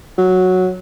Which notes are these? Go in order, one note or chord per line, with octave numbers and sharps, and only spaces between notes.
F#3